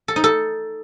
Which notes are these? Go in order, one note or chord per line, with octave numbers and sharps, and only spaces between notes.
A4
D#4
A4